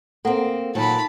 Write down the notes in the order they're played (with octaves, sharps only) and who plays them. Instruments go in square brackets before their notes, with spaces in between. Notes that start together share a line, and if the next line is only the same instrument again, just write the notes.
[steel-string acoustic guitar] A#3 C4 [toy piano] A4 F#5
[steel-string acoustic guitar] A#2 D#3 F#3 [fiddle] A5 B5